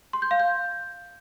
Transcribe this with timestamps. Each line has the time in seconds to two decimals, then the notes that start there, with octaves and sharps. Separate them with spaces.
0.13 C6
0.22 G6
0.31 F5
0.40 G6